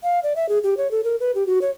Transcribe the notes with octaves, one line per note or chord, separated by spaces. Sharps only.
F5
D5
E5
G#4
G4
C#5
A4
A#4
B4
G4
F#4
C#5